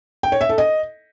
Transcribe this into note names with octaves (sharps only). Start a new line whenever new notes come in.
G5
C#5
E5
A4
D#5